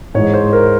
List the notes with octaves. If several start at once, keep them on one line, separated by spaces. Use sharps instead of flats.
G#2 E3 G#3 C#5
C5
A#4